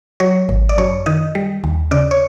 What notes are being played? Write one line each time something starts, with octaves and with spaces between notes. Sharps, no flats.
F#3 C#5
G#1
D5
F#2 C#5
D#3 D#5
G3
D#2
C#3 D5
C#5